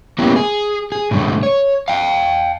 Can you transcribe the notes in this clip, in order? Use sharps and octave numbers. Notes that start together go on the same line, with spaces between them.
A#3 B3 C#4 E4 G4
G#4
G#4
A2 D3 D#3 G3 A3
C#5
F5 G5